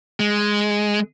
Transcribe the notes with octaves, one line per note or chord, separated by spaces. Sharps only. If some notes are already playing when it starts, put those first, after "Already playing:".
G#3